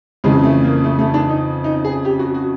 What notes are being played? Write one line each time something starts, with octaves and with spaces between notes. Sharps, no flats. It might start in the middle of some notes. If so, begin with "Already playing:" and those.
F2 C#3 E3 G#3
A3
A#3
A3
A3
D4
D#4
D#4
G#4
G4
F#4
F#4